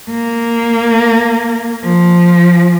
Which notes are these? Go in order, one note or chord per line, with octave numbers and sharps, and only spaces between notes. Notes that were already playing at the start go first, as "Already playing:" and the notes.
A#3
F3